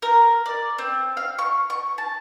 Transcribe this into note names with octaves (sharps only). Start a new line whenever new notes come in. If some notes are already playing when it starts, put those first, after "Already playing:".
A#4
D5
C4
F5
C#6
C#6
A5